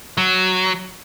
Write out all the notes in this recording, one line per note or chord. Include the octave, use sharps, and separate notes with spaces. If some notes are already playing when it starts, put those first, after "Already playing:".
F#3